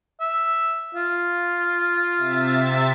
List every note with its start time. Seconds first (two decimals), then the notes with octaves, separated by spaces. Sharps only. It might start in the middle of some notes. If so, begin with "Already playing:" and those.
0.21 E5
0.95 F4
2.17 C3 E5 A6